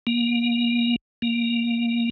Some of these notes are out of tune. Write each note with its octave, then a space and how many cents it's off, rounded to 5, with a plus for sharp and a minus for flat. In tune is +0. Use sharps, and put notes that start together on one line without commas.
A#3 +30
A#3 +10